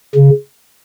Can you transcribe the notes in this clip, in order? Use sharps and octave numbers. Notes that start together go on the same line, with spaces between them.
C#3